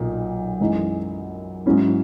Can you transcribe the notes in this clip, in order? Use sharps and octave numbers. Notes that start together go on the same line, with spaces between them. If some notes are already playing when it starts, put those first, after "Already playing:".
Already playing: B1 A#2 D#4
F#2 E3 G#3 D#4
G#2 F#3 C#4 E4